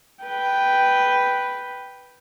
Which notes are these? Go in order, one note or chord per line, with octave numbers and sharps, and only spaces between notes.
B4 G5